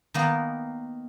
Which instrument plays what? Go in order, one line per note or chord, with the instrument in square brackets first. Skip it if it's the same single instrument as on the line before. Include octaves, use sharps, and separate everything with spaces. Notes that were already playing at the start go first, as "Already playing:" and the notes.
[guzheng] D#3 A#3 B3